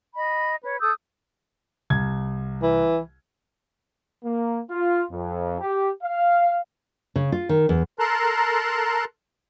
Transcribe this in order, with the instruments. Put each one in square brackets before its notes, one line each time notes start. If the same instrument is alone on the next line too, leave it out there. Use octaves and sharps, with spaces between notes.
[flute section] D#5 B5
B4 C#5
A4 D#6 E6 G6
[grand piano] C2 G#6
[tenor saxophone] E3
[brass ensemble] A#3
F4
F2
G4
F5
[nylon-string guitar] C#3
F4
D#3
E2
[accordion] A4 A#4 A5 A#5 C6 F#6